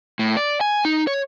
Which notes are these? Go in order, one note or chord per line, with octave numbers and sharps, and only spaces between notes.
A2
D5
G#5
D#4
C#5